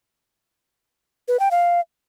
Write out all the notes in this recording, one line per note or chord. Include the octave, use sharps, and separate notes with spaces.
B4
G5
F5